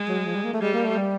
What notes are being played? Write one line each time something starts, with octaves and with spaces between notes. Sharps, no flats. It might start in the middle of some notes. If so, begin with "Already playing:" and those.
Already playing: G#3
F#3
F3
G3
A#3
A3
G3 G#3
A#3
A3
G3